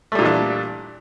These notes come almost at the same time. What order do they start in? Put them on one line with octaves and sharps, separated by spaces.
A3 G3 A#2 E3 D4